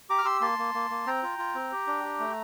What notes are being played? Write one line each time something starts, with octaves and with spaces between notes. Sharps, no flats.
G4 A#5 D6
F6
G4 C6 E6
A#3 A5 C6
A#3
A#3
A#3
C4 G5 A#5
F4
F4
C4
G4
D4
G4
A3